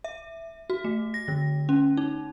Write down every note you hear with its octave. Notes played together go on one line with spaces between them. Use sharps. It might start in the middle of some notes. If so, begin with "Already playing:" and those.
E5
F#4
A3
A#6
D3
C#4
D#4